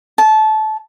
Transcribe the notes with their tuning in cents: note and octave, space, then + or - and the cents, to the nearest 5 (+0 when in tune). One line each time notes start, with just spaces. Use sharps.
A5 -20